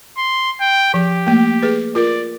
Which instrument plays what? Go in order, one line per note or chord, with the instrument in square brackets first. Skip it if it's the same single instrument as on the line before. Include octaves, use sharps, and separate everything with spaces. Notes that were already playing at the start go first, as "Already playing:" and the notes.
[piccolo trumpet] C6
G5
[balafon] F3 [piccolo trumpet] G4
[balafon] A3 A#3
G#4 B4
[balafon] F4 A#4 [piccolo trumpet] D5